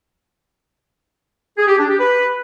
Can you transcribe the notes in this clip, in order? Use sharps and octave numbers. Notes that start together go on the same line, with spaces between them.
G#4
G4
D4
G4
B4